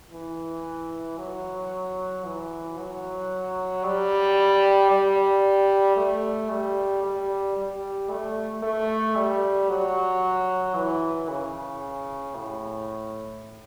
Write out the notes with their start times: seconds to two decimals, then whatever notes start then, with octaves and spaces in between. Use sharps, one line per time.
0.12 E3
1.18 F#3
2.25 E3
2.78 F#3
3.84 G3
4.91 G3
5.97 A3
6.50 G3
7.04 G3
7.57 G3
8.10 A3
8.63 A3
9.16 G3
9.69 F#3
10.76 E3
11.29 C#3
12.36 A2